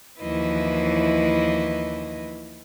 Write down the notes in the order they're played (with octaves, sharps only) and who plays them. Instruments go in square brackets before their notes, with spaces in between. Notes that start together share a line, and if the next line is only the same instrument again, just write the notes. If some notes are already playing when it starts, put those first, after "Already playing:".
[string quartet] D#2 E3 F3 E4 B4 D#5